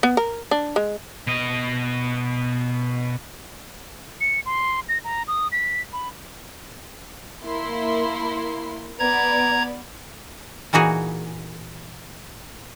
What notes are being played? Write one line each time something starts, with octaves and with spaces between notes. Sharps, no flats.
B3
A#4
D4
G#3
B2 D#5
C#7
C6
A#6
A#5
D#6
B6
B5
A#3 E4 C6
B3 D5 A#5 G#6
A#2 E3 D#4 F#4 G#4